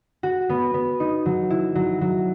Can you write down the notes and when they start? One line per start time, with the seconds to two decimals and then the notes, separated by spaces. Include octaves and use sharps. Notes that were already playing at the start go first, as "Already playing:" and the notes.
0.23 F#4
0.49 B3
0.74 B3
1.00 D#4
1.26 F#3
1.50 E4
1.75 F#3
2.01 F#3